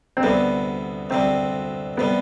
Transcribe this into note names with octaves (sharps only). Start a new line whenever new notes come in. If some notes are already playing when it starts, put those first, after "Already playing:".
C4
D2 C3 G3 B3
D2 C3 G3 C4
C3 G3 B3